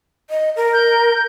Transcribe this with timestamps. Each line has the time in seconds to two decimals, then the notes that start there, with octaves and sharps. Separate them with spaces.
0.30 D#5
0.56 A#4
0.73 G6